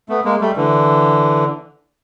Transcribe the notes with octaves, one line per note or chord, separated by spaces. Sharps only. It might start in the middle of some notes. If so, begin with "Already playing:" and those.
A3 B3
G#3 A#3
G3 A3
D3 E3